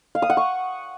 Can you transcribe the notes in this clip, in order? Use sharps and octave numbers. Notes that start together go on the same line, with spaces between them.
F5
D#6
F#5
C#6